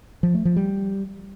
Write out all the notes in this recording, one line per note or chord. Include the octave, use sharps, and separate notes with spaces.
F3
A3
F3
G3